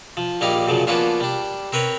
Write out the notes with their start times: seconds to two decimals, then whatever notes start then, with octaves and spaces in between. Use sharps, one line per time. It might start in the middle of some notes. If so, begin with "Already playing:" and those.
0.17 F3
0.41 A#1 G3 A#3 D#4 G4 F5
0.67 F#2 A#2 C#3 F3
0.87 F3 A#3 B3 C#4 D4 F4
1.20 G3 D4
1.72 C4 A#4 B4 C#5